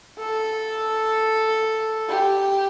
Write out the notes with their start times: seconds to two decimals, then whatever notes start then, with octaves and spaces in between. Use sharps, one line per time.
0.19 A4
2.09 G4